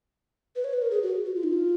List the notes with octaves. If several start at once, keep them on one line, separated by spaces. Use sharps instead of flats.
B4
C#5
B4
A#4
G#4
F#4
F#4
F4
D#4
F4